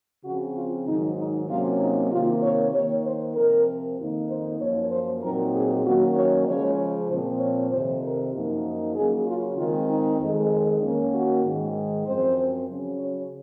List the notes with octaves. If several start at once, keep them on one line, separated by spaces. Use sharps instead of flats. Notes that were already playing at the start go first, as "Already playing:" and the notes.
C#3 F3 C4 F#4
F4
G#2 D#3 F#3 D#4
D#4
C3 F#3 A#3 C#4 F4
D#4
C3 D#3 A#3 F4
C#5
D#3 A#3 D#4 C#5
C5
C3 F3 C4 A#4
F2 D#3 A#3 D#4
C5
F#2 F3 A#3 C#5
C5
A#2 F#3 C4 D#4 A#4
G#4
D#3 F#3 A#3 C#4 F#4
C#5
C#3 F3 G#3 C#4 C#5
A#2 F3 C4 C5
C#5
F2 C3 D#3 C5
A#4
F#2 F3 A#3 D#4
C#3 F#3 A#3 C#4 G#4
F4
D#3 G#3 C4 F4
D#4
F2 D#3 G#3
D#3 A#3 C#4
F#4
G#2 D#3 G#3
F#2 F3 C4 C5
C#3 F#3 C#4
C#5